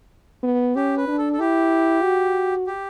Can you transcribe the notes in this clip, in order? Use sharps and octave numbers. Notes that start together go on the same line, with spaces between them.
B3
C#4 G4
B4
D4
A4
A4
E4 G4
F#4
G4